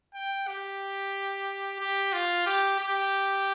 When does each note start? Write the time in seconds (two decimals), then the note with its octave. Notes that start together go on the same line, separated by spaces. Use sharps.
0.14 G5
0.47 G4
1.79 G4
2.13 F4
2.46 G4
2.79 G4